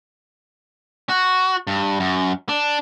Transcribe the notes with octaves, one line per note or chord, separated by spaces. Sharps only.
F#4
G2
F#2
D4